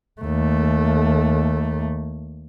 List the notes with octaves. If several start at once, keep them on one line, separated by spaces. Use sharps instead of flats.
D#2 A3